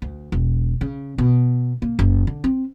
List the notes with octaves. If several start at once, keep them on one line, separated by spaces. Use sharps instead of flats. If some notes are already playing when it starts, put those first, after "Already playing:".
D2
E1
C#3
B2
A#3
F#1
D3
C4